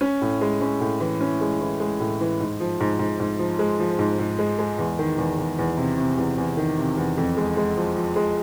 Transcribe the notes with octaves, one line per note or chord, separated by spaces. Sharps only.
C#4
A2
G#3
C#4
A2
E3
C#4
G#3
E3
G#3
A2
E3
G#2
F3
G#2
G#2
G#2
F3
G#3
F3
G#2
G#2
G#3
G#3
E2
D#3
E2
E2
E2
C3
C3
E2
E2
D#3
C3
E2
F2
G#3
G#3
F3
F3
G#3